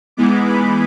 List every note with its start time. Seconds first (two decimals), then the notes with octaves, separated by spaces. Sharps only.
0.17 G#2 E3 G#3 B3 D6
0.47 B5